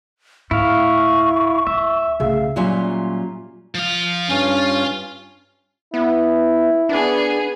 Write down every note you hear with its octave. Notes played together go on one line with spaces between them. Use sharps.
D2 A2 E4 F5 C#6
D1 E4 E5
C2 C#3 A3 G#4 F5
A#2 F#3 G3 C#4 F4 E5
F3 F5
G2 C#4 F4
B3 E4
B3 D4 G#4